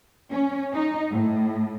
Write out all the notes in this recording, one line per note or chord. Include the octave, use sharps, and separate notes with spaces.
C#4
D#4
A2